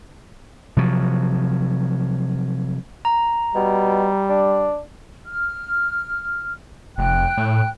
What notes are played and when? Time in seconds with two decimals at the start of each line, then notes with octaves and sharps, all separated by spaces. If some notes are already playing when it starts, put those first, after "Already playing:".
0.77 C3 F3 F#3
3.05 A#5
3.55 B2 G3
4.29 D4
5.26 F6
6.98 F1 G5 F#6
7.37 A2